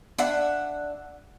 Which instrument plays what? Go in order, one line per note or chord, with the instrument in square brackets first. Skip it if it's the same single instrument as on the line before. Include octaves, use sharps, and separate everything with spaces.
[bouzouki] D4 E5 F#5